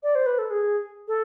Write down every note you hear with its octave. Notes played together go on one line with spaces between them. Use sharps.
D5
C5
B4
A4
G#4
A4